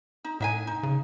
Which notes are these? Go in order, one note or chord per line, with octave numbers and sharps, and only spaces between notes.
D#4
A2 D#4 E5 G#5
D#4
C#3